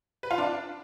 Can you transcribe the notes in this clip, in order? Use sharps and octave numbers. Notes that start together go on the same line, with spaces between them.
B4
F4
D4